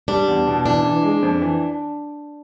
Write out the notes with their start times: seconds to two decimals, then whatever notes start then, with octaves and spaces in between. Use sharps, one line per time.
0.08 G3 D4
0.28 E2
0.47 B2
0.65 E3 D4
0.84 E3
1.03 G#3
1.22 F2
1.42 E3